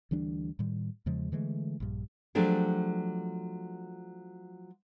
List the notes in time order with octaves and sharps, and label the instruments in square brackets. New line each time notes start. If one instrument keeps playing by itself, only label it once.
[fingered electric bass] D2 E3 G3 D4
A2 D#3 G3
E2 C#3 F3 G#3
D3 E3 G#3 A3
A#1 G2
[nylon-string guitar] F3 F#3 A3 D4 G4 G#4